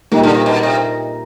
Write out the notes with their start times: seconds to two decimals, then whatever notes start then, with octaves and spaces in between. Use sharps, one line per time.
0.11 A#2 D#3 G3 A#3 D#4
0.23 D3
0.34 C3
0.46 B2
0.63 C3